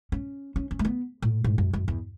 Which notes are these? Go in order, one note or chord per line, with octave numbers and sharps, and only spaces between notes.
C#4
C#4
C#4
A3
B3
A2
G#2
F#2
F#2
E2